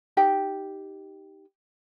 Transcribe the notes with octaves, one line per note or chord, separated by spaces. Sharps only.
D#4 G4 G5